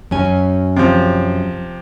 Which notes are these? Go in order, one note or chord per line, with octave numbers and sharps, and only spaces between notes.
F#2 C#4 G#5
C3 F3